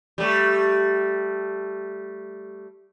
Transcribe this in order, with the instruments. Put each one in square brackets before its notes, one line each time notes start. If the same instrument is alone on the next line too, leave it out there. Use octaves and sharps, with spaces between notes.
[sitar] G3 A3